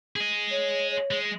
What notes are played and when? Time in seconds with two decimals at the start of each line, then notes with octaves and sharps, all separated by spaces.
0.16 G#4 D#5
0.51 C#5
0.91 C#5
1.11 G#3